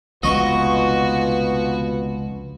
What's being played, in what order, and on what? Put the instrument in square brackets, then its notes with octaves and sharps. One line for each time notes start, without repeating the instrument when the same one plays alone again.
[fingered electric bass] F1 C#2 [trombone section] B2 F4 B4 [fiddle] F#4 [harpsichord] D#5 C#6